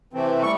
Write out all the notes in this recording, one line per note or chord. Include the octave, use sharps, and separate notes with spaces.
C3 E3 A3 C4
G3 C#6